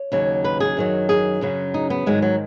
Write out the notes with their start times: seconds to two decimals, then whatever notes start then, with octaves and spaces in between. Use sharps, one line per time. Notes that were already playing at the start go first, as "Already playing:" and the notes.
Already playing: C#5
0.12 D#2 C#3 F#3
0.44 B4
0.60 G#4
0.77 F#2 D#3 F#3
1.09 G#4
1.41 F#2 C#3 F#3
1.74 D#4
1.90 B3
2.06 G#2 D#3 F#3 G#3
2.22 F#3